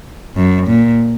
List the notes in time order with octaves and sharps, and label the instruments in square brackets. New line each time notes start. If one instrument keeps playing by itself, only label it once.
[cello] F#2
A#2